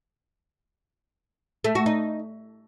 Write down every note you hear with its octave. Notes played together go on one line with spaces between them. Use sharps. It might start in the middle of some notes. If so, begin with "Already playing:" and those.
A3
F#4
D#4